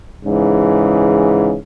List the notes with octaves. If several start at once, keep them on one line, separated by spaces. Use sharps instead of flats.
G#2 C#3 E3